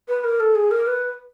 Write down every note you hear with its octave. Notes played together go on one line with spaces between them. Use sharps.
B4
A#4
A4
G#4
A#4
B4